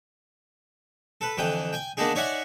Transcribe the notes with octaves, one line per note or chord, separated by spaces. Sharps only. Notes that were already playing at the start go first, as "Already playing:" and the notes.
A4 B4
F2 D3 E3 G5 D#6
G5 G#5
D#3 A#3 B3 D4 D#4 G#4
D#4 C#5 D5 E5 F#5 G#5